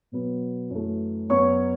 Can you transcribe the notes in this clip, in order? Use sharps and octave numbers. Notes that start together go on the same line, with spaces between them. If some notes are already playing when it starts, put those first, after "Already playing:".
B2 F#3 B3
F#2 E3 A3
F#2 F#3 B3 C#5 C#6